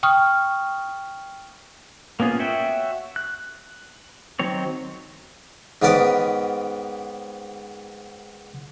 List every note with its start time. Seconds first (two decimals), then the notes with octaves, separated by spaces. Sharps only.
0.03 G5 C#6 D#6 F6
2.20 A#3 B3 C#4 F4 G#4
2.39 F#4 C#5 E5 G5
3.16 F#6
4.39 D#3 F#3 C4 C#5
5.82 G#2 D#3 B3 C#4 D5 D#6